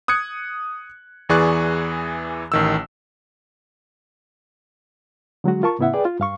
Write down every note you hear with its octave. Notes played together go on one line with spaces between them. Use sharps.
D#6 F#6 G#6 C#7
E2 E3 G#4 D5 C#6 F#6
A1 D#3 E6
D3 F#3 G#3 F#4
F4 A#4 A5 C#6
A2 C#3 B3 E4 E5 F#5
G#4 B4 D5 G5
F4
G2 F5 C#6